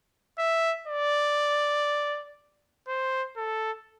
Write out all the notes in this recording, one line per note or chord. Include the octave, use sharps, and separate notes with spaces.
E5
D5
C5
A4